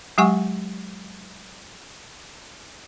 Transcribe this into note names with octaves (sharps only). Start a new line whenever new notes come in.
F#3 G#3 G4 F#5 G#5 C#6